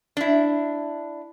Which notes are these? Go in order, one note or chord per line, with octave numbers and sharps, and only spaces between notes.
D4 E4